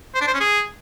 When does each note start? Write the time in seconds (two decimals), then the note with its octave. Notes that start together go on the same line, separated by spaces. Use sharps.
0.15 C5
0.21 D4
0.27 C5
0.34 C#4
0.40 G#4